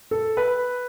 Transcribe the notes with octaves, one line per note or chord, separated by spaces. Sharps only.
A4
B4